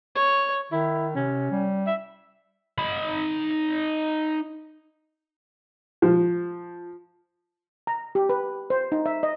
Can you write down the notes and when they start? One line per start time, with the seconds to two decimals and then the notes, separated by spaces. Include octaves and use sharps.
0.15 C#5
0.72 D#3 E4
1.16 C3 C#4
1.51 G3
1.87 E5
2.78 D#4 B5
6.02 F3
7.87 A#5
8.15 G4
8.29 B4
8.70 C5
8.92 D#4
9.06 E5
9.23 D#5